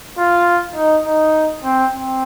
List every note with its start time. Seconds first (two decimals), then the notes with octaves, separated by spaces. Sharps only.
0.18 F4
0.75 D#4
1.06 D#4
1.64 C4
1.93 C4